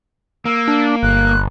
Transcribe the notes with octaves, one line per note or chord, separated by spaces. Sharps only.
A#3 E6
D4
G1 F#6